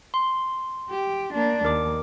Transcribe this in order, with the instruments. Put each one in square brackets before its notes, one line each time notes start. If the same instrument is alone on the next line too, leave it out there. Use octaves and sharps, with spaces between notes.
[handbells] C6
[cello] G4
A#3 D4
[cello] D#2 [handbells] A#4 D6